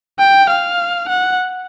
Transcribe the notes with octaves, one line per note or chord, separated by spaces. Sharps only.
G5
F5
F#5